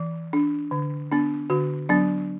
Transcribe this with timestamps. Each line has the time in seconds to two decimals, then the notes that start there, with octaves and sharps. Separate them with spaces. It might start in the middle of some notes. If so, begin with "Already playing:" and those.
Already playing: E3
0.33 D4
0.71 D3
1.12 B3 D4
1.50 D3 F#4
1.89 F#3 B3 D4